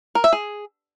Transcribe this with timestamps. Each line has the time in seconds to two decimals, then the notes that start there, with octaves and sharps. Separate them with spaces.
0.15 A#4
0.24 E5
0.33 G#4